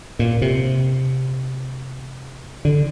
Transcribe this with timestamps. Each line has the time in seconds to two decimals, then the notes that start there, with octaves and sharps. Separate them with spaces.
0.19 A#2
0.42 C3
2.65 D3